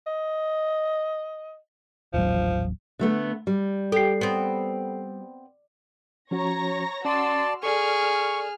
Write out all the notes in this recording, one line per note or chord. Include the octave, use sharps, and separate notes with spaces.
D#5
D#1 A1 F3 F#3
D3 A3 B3
G3
G4 A4 C7
B3 C4
F3 C#4 F#4 C#5 A#5 A#6
C#4 F#4 D5 A5 C6 E6
G#4 A4 D5 C#6 F6